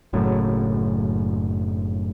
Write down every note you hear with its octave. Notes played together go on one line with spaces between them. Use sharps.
F#1 F#2 A2 C#3